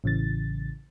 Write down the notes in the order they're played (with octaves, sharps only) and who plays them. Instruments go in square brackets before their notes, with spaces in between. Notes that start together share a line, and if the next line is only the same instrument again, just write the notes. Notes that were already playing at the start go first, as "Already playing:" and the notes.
[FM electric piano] A1 C#3 E3 A6